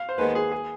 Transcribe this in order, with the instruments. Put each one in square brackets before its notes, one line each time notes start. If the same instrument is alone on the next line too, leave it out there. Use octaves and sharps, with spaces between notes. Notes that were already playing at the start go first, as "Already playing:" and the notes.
Already playing: [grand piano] F5
C5
[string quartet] D#2 D#3 G#3 B3 [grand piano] B4
[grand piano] G#4
G#4